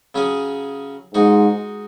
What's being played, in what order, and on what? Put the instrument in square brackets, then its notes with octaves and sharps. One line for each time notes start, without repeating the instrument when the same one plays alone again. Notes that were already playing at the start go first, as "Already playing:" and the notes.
[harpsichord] C#3 F#3 C#4 G#4
[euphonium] G#2 [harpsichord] G#3 D#4 F#4